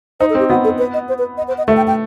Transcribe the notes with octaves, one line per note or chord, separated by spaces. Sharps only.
D#4 C5
A4
C4 G4
B3 F#4
A4
B4
D#5
C5
B4
D#5
C5
D#5
A3 E5
G5
G5